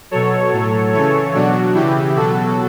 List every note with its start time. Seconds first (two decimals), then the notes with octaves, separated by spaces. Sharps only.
0.11 B2 F#3 A4 C#5
0.53 A2 F#3
0.93 C#3 E3 A4 C#5
1.34 B2 F#3 D4 F#4
1.74 C#3 E3 E4 G4
2.15 B2 F#3 F#4 A4